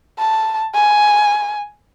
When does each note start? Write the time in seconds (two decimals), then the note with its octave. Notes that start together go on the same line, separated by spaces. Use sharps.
0.19 A5
0.74 G#5